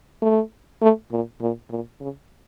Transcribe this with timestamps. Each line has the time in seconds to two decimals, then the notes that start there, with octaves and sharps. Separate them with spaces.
0.22 A3
0.81 A3
1.11 A#2
1.41 A#2
1.70 A#2
2.00 C#3